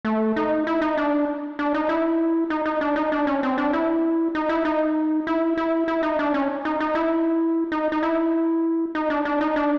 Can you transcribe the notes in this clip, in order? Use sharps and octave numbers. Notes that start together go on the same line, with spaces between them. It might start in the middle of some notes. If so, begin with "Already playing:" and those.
A3
D#4
E4
D#4
D4
D4
D#4
E4
D#4
D#4
D4
D#4
D4
C#4
C4
D4
E4
D#4
E4
D#4
E4
E4
E4
D#4
D4
C#4
D#4
D#4
E4
D#4
D#4
E4
D#4
D4
D4
D#4
D4